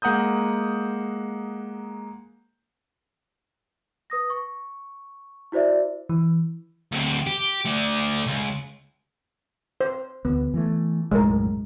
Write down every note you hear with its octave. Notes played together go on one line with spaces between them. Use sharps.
G#3 A#3 F#5 A#5 D#6 G6
B4 D#6 A#6
C#6
E4 F#4 C5 D5 E5
E3
D2 C4
G4
A3 D5
C#2
C5
D2 B3
E3 A3
B1 F#2 A2 G#3 A#4